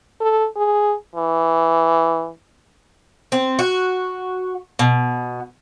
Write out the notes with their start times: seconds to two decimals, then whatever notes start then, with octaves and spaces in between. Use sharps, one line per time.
0.21 A4
0.56 G#4
1.16 E3
3.32 C4
3.59 F#4
4.79 B2